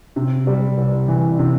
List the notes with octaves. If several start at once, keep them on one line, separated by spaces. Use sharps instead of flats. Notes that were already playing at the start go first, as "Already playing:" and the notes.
C3
G3
C2
E3
C3